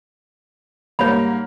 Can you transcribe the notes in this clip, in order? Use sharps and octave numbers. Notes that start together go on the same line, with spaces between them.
G#2 G3 A#3 C#5 B5